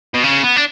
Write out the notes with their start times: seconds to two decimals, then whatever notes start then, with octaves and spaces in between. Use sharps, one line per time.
0.14 B2
0.23 C#3
0.43 B3
0.56 D4